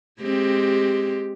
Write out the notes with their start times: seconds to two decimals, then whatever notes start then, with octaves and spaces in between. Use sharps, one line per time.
0.21 G#3 C4 G4